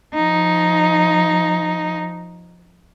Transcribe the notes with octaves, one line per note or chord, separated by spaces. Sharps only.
F3 D#4